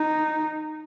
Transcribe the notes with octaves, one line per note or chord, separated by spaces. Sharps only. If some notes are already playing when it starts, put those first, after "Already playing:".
Already playing: D#4